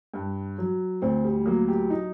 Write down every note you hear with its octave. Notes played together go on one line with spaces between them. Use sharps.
G2
F#3
D2 C4
G3
F#3 A#3
G4
D#4